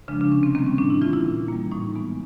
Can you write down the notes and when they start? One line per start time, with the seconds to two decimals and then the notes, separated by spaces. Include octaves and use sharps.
0.08 C#3 F3 G#3 D4
0.21 D4
0.32 C3 C#4
0.43 C4
0.55 D#3 G3 A#3 C4
0.67 C#4
0.78 A2 D4
0.90 E4
1.01 E3 A3 C4 F4
1.13 E4
1.25 A#2
1.48 G3 A#3
1.72 A2 D#4
1.95 E3 G#3 B3